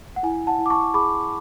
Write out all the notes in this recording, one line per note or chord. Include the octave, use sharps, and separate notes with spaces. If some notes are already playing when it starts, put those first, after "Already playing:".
F#5
E4 G#5
F#5 A5
E4
D6
A5 C#6
G#4 B5 D6